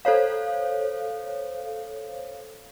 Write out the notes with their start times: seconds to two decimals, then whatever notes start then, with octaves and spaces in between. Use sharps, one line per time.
0.05 A4 C5 C#5 F5